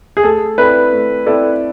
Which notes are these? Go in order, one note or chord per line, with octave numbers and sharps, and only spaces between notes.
G#4
A3 A4
C4 E4 A4 B4 D5
A3
C4 E4 A4 D5